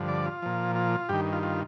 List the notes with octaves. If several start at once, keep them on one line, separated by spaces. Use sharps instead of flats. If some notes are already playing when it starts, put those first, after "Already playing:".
Already playing: G2 D3 F3
D5
F4
A#2 F3
F4
G2 D#3 G4
F4
F4